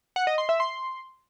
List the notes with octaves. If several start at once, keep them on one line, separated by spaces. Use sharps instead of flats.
F#5
D#5
C6
E5
C6